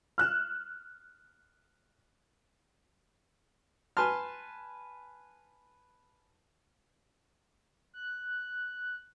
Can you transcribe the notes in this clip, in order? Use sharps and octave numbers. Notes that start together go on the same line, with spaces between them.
F6 F#6 E7
B4 G#5 A5 C6 F6
F#6